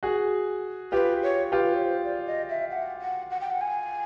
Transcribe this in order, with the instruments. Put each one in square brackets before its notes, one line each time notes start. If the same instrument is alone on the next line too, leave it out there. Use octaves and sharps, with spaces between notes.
[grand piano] F#4 G#4
[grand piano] F4 G4 [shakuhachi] B4
[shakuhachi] C#5
[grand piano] F4 G4 [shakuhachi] B4
[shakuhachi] C#5
C5
D5
D#5
E5
F#5
F#5
F#5
G5
F#5
G#5